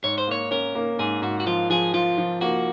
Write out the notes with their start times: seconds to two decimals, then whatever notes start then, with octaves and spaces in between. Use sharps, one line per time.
0.04 G#2 C#5
0.18 C5
0.28 A#3 C#5
0.51 C#4 A#4
0.75 A#3
0.99 G#2 G#4
1.22 G#2 F#4
1.40 F#4
1.46 F3 F4
1.70 F3 G#4
1.94 F3 F4
2.18 F3
2.41 A#3 F#4